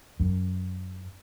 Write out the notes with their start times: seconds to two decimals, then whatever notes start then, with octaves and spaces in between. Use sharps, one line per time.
0.20 F#2